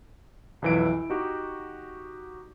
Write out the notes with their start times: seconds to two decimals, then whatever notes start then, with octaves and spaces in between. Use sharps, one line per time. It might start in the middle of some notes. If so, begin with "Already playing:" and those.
0.62 B1 F2 E3 E4 D7
0.89 E4
1.10 D#4 F#4 G4